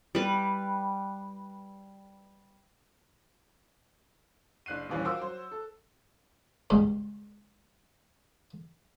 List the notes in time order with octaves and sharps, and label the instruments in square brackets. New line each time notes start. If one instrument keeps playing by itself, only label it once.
[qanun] G3 B4
[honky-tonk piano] F#1 D4 F#6 C7 D#7
A#1 D#2 E3 G3 C#4
F4 F#4 A#4 C5 D6 E6
F#3 C5
A4
[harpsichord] C#2 G2 B2